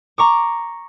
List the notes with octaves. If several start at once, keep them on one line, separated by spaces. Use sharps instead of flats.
A#5 C#6 D6